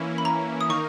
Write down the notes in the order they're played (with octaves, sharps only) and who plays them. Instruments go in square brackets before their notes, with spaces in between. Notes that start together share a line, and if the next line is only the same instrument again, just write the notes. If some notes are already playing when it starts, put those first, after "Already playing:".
Already playing: [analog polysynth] E3 A#3 C#4 E4
[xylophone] B5
A#5
D#6
[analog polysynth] D#3 A#3 D#4 A#4 [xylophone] C#6